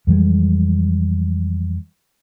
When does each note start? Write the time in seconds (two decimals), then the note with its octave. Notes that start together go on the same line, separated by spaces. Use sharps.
0.07 F2 E3 G3 G#3